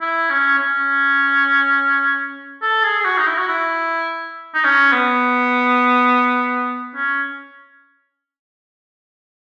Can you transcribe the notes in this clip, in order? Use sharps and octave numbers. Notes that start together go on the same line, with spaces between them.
E4
C#4
C#4
A4
G#4
G#4
F#4
D#4
E4
F#4
E4
D#4
C#4
B3
C#4